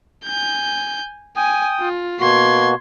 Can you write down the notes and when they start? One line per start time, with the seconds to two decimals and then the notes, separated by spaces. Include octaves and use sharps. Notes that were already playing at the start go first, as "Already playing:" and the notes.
0.25 G#5 G6
1.37 G5 G#5 D#6
1.80 F4
2.20 B2 A#3 F#4 C6 G#6